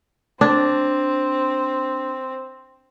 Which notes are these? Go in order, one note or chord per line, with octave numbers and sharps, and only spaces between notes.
C4 D4